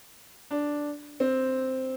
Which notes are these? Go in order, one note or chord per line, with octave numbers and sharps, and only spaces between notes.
D4
C4